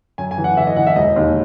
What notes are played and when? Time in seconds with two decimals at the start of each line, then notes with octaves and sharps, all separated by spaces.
0.18 F#2 G#5
0.31 G#5
0.38 E3
0.44 F#5
0.57 E3 E5
0.67 D#5
0.77 E3 F#5
0.87 E5
0.96 E1 D#5
1.16 D#2